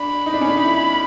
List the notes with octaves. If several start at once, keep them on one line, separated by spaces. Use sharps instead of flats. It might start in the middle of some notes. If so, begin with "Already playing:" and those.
Already playing: D4 B5
D#4
D4
C#4
D4
D#4
E4